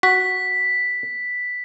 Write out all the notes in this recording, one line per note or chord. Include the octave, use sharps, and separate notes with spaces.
F#4 B6